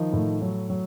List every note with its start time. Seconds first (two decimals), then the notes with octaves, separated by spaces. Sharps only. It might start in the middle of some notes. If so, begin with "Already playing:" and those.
Already playing: D#3 F3 D#4
0.13 A2
0.42 F#3
0.70 F#3